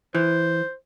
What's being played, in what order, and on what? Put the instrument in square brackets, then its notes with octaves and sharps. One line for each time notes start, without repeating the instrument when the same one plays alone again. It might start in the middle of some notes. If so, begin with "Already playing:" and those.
[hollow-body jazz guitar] E3 [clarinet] C5